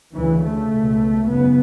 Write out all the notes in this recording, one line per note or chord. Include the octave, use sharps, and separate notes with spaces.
D2 C#3 E3
A3
C#2 B2
G#1 F#2 C#3 B3